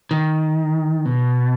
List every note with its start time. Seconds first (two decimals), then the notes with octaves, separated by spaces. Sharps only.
0.11 D#3
1.05 B2